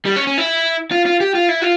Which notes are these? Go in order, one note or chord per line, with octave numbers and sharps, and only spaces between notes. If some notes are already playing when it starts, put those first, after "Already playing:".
G3
C#4
C#4
E4
F4
F4
G4
F4
E4
F4